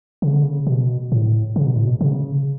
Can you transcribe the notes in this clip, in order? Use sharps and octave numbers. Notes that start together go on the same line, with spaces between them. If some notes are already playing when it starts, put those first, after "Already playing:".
C#3
D3
C#3
B2
A2
C#3
B2
A2
B2
C#3